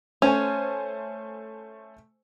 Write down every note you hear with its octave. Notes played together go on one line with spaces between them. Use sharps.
A3 C#4 C5 G#5